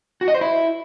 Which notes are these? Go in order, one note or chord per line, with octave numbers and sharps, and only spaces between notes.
F#4
D#5
C5
E4